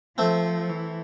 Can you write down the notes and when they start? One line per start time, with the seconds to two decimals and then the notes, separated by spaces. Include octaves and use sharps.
0.18 F3 A3 C4
0.69 E3